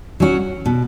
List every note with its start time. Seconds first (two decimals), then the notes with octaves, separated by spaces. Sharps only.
0.20 F#3 C#4 F#4
0.66 B2